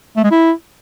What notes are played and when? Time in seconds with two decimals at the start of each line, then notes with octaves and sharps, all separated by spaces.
0.16 A3
0.24 G#3
0.31 E4